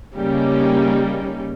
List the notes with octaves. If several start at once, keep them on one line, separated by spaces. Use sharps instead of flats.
C#3 G3 A#3 C#4 D#4